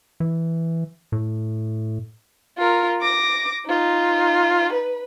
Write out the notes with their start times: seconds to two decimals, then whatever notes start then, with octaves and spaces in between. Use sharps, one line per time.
0.20 E3
1.12 A2
2.58 F4 A#4
3.01 D6 A#6
3.67 D#4 F4
4.73 B4